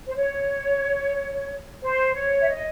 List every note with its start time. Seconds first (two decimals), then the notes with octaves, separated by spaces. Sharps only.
0.05 C5
0.16 C#5
1.82 C5
2.14 C#5
2.40 E5
2.47 D#5